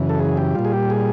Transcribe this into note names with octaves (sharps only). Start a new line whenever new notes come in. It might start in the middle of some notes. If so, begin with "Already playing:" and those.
Already playing: F#2 C#3 E3
A4
G#4
G4
A#2 G3 F4
G#4
G4
G#4